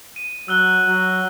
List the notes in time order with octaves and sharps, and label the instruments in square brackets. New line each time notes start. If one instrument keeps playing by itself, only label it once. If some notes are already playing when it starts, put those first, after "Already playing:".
[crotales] D#7
[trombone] F#3 [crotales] E6 F#6 G7
[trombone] F#3